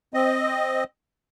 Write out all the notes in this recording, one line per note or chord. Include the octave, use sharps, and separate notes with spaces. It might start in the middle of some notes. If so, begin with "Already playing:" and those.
C4 D#5